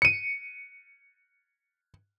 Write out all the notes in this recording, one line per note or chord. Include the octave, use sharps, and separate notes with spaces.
C#7 D#7